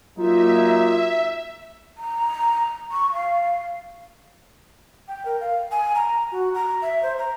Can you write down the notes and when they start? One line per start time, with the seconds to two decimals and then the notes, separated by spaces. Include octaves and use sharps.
0.18 F#3 A#3 D#4 F4 E5
1.98 A#5
2.92 C#6
3.13 F5
5.08 G5
5.25 A#4
5.40 F5
5.71 G#5
5.95 A#5
6.32 F#4
6.55 A#5
6.82 E5
7.03 C5
7.19 A#5